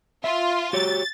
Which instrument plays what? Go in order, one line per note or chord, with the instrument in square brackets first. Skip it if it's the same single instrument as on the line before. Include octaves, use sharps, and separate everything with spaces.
[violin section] F4 [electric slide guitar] E5
[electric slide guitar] F#4 G4 C#5 [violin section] A6